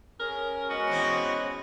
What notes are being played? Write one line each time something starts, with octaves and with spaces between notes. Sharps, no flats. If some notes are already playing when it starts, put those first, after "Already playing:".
C#4 G#4 A#4
G#3 B3 C#4 F#4
B2 E3 C4